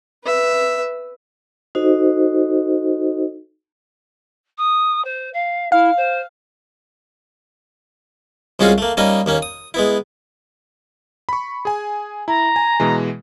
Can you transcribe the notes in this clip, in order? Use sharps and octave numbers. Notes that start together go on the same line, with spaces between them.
B4 E5
D#4 F#4 A4 C5 D#5
D#6
C5
F5
E4 F5
C5
C2 G#3 C#4 F4 F#4 G#4
A3 A#3
G3 A#3 C#4 D#4 D#5
D#2 A#3 C#4
D#6
G#3 B3 E4
B5 C#6
G#4 G#5
E4 A#5
G#5
B2 E3 G#3